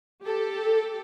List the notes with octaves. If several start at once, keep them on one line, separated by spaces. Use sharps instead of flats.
G4 A4